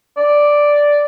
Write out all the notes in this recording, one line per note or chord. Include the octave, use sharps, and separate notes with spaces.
D5